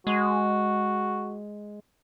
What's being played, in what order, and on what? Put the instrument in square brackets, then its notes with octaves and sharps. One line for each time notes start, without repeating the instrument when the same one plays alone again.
[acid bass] G#3 [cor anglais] F#4